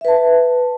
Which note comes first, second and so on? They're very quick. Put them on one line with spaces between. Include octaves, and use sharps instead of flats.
E5 B4 A5